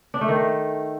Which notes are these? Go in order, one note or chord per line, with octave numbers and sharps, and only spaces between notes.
D4
A3
D#3